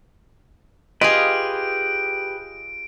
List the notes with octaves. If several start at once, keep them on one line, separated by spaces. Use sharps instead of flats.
F4 G4 G#4 B4 D#5 D7